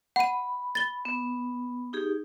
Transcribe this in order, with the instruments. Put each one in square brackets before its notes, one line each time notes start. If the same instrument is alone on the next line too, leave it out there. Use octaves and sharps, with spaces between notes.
[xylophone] F#5 D#7 [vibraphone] B5
[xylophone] A6 G7
[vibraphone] B3
D#4 G4 G#4